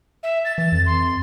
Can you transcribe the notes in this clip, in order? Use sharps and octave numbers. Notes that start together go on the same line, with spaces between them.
E5
A6
E3 A6
F2
C6